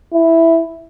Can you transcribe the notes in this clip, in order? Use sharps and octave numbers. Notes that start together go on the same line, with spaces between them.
E4